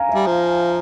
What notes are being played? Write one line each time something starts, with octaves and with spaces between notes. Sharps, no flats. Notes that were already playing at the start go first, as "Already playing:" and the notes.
Already playing: F5 G#5 A#5
E5
G3
F3